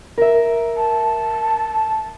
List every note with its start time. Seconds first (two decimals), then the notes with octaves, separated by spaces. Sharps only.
0.18 A#4 E5
0.77 A5